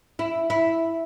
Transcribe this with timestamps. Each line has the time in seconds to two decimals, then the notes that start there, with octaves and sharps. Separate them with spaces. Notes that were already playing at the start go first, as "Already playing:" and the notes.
0.19 E4
0.50 E4